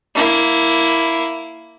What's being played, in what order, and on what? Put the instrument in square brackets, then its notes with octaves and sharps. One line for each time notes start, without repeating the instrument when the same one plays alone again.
[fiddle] A#3 E4